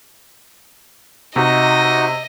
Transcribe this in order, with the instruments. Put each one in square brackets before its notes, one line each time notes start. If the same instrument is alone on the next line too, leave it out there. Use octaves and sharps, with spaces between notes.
[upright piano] C3 [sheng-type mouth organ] D#4 F#4 [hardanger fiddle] D#5